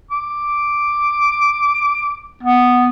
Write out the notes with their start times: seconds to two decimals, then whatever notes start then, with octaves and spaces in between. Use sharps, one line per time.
0.11 D6
2.43 B3